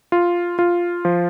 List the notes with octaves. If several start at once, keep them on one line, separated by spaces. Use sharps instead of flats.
F4
F4
F3